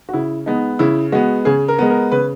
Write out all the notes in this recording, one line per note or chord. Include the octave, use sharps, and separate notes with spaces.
F#4
C#3 E4
G#3 B3 D#4
C#3 E4
G#3 B3 F#4
C#3 G#4
A#4
G#3 B3
A#4
C#3 B4